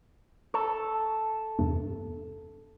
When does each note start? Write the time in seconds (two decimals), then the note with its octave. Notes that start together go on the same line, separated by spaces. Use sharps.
0.54 A4 C#6
1.59 E2 G2 C3